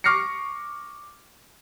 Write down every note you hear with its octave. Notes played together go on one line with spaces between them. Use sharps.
C#6 D6 F6 A#6 C7 C#7